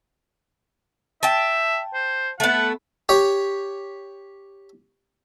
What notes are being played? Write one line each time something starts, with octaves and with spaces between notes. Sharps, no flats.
E5 G5 A5
C5
A3 B3 F#5
G4 C#5